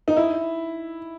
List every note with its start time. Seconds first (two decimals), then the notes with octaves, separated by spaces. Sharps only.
0.08 D#4
0.17 E4